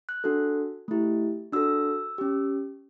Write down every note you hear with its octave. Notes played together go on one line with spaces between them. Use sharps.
F#6
D4 F#4 A4
A3 E4 G4
D4 F#4 A4 E6
C#4 G4